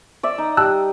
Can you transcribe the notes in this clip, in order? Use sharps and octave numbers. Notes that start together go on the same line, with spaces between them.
D5 E5
D#4
G3 A5 E6 F#6